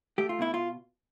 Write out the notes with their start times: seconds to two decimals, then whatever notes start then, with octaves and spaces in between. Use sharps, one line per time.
0.18 A3 G4
0.29 F4
0.39 B2 E4
0.54 F4